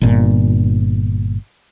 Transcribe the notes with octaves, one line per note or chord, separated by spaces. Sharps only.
G1 A#2